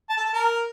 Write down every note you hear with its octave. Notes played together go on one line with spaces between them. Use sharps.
A5
A4
A5
A#4